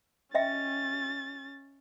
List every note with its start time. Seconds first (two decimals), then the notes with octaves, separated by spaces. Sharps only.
0.35 C#4 D#5 E5 G5 A6